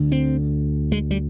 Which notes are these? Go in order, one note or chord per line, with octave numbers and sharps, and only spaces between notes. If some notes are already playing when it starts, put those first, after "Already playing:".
Already playing: D2 D3
C4
G#3
G3